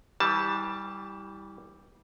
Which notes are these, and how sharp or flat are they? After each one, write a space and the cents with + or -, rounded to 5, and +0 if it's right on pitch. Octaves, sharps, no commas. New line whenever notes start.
E3 -30 G3 +0 A5 +10